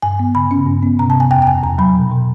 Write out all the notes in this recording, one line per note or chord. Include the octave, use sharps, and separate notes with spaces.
G2 G#5
B3
C#3 B5
C#4
G2
B3
C3 A#5
A5
C3
G#5
F2 G5
G5
F2 G#5
E2 A#5
F#3 B5
B2
B2